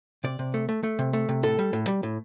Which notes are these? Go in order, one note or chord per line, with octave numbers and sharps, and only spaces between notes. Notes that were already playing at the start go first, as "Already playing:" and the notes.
C3 D5
C3
A3
A3
A3
C3
A3
C3
A2 A4
G3
A2
G3
A2